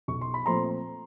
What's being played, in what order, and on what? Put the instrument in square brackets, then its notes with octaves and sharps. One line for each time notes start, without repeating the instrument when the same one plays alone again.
[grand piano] B1 C#6
C6
B5
A#2 F3 A3 C4 A#5 C6